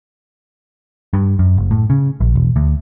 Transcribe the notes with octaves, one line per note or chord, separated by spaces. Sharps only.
G2
F#2
F#1
A2
C#3
A#1
E1
D2